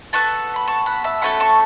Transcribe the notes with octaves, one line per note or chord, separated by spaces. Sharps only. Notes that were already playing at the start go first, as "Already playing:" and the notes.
B3 F#4 A4 A5 C#6
B5
A5 C#6
F#5 B5
E5 A5
A3 C#4 F#4 A4 F#5 B5
A5 C#6